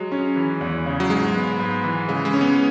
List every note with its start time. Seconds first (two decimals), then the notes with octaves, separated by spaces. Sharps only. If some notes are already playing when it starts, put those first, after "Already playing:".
Already playing: F#3 G#3
0.12 C#4
0.36 E3
0.61 E2
0.86 C#3
1.00 F#3
1.10 G#2 G#3
1.35 B3
1.60 G#2
1.84 E3
2.08 C#3 G#3
2.25 G#3
2.33 C#4
2.41 B3